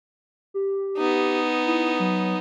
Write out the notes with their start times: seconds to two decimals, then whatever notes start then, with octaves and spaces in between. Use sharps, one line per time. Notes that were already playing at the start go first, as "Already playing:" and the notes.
0.54 G4
0.97 B3 D#4
1.66 E4
2.00 F#3